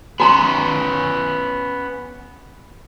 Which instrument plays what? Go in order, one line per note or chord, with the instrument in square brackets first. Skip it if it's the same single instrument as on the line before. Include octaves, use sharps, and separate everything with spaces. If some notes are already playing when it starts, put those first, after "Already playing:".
[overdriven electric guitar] B3 C#4 [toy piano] F#4 A#5 C6